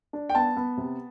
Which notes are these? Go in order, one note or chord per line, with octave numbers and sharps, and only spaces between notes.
D4
G5
B3 A5
B3
C3